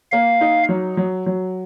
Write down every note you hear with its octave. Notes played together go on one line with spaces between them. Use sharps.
A#3 F5
D#4
F#3
F#3
F#3